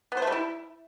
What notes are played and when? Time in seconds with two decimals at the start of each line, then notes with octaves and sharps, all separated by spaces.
0.12 B3
0.17 C5
0.22 A3
0.27 G3
0.32 E4